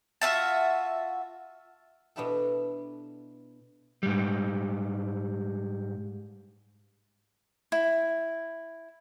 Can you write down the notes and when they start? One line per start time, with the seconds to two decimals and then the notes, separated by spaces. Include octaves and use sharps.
0.21 F4 F#4 E5 A5
2.16 B2 B3 D4 E4 G4 A4
4.03 G#2 G3
7.72 E4